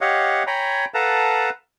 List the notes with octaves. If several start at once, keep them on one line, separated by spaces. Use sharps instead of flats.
G4 C#5 D#5 F5 F#5
C#5 G5 G#5 A#5 B5
A4 B4 F5 F#5 A5 A#5